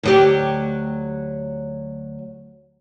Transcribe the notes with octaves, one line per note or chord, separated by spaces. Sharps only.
D2 F#3 G4